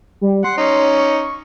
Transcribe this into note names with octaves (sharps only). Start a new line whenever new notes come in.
G3
F#5 C6
C#4 D#4
C#6